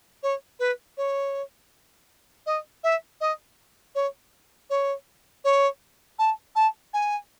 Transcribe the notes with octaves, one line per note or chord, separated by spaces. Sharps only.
C#5
B4
C#5
D#5
E5
D#5
C#5
C#5
C#5
A5
A5
G#5